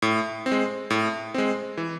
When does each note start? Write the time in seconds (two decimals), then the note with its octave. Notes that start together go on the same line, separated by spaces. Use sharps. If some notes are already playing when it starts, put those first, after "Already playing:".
0.02 A2
0.46 C4
0.52 G#3
0.90 A2
1.34 G#3 C4
1.77 E3